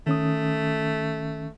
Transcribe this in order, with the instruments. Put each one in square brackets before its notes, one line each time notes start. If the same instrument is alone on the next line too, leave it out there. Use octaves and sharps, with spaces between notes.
[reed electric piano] D#3 C#4 D#6 [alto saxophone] A3